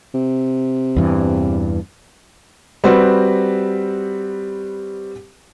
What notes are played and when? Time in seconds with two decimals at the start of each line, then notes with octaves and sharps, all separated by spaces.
0.15 C3
0.96 E2 G2 E3
2.84 G3 C4 F#4 B4